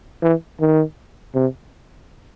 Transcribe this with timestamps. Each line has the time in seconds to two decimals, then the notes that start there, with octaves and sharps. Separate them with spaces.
0.22 E3
0.60 D#3
1.35 C3